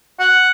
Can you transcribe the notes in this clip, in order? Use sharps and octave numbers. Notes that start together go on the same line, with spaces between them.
F#5